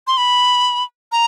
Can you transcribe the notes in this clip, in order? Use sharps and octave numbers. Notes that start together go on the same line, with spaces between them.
C6
B5
A#5